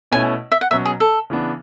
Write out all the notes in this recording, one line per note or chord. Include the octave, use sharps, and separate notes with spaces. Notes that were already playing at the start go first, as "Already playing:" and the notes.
B2 A3 C#4 E4 G#5
E5
F#5
B2 F#3 C#4 E5
G#4
A4
C#3 E3 B3 D4